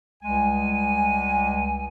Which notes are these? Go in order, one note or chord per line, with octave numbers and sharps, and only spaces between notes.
C#2 G3 G#3 G#5